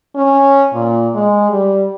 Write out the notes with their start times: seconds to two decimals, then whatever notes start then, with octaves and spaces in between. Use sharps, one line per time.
0.16 C#4
0.73 A#2
1.14 G#3
1.51 G3